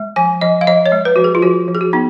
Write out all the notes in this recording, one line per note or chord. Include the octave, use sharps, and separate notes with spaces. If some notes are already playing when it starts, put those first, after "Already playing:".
Already playing: G#3
F3 G#5
F3 D#5
F5
F3 D#5
C#5
G#3
B4
F3 F#4
G#4
F4
F3 F#4
F3
G#4
F#4
B3 D#4